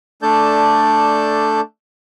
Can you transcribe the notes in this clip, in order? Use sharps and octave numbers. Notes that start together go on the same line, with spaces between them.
A3 D4 A4 D5 A5 G6